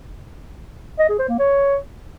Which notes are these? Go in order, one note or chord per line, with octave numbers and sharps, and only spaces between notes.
D#5
G#4
C5
A#3
C#5